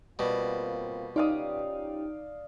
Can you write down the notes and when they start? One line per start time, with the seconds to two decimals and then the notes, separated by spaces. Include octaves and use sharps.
0.19 B2 G3 A#3 C4 F4
1.16 C#4 D#4 F4 G4 D5 F5 D#6